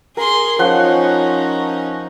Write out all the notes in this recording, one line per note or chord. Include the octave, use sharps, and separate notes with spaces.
G#4 A#4 C6
F3 C#4 D#4 F#5